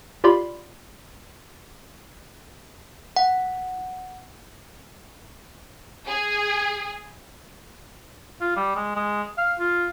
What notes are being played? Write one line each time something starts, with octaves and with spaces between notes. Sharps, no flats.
F4 G4 D5 B5 C6
F#5
G#4
F4
G3
G#3
G#3
F5
F4